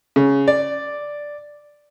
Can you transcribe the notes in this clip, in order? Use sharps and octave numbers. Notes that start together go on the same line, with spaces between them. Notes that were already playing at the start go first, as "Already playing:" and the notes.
C#3
D5